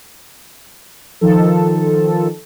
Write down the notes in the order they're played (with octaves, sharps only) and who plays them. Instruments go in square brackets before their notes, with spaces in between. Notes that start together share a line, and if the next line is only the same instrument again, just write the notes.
[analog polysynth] D#3 F3 A4